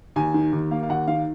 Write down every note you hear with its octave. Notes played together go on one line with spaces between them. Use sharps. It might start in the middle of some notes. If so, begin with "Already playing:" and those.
D#2 G#5
D#3
D#2
A#3 F5
F5
D#2 F#5
D#3 F5